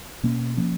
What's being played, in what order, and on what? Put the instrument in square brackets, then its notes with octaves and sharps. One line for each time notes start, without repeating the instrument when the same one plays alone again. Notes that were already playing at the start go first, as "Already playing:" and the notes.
[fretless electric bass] B2 A#3 C#4
F3 A#3 C#4